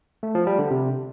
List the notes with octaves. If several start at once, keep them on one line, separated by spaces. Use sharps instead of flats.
A3
F3
G3
D3
C3